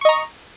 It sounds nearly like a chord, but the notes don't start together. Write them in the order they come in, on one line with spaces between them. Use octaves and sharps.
C#6 D#5 A#5